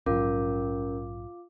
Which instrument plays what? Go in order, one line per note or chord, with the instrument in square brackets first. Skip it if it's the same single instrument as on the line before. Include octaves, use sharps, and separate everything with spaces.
[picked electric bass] A#1 G#2 F#3 [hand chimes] C#4 A#4 [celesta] F4 F5 D6